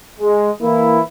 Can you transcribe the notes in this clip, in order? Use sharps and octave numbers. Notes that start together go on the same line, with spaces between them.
G#3
E3 A#3 E4